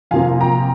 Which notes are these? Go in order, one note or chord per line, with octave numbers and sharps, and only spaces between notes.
F2 C3 F3 A#3 F5 G#5
G5 A#5